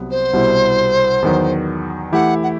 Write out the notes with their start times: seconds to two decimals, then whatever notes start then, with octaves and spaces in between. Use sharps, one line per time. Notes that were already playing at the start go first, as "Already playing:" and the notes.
Already playing: C2 C3 F#3 B3
0.11 C5
0.33 C2 B2 G3 B3 E4
1.22 E2 D#3 F#3 B3
2.12 E3 A3 E4 G4 F#5
2.43 F#5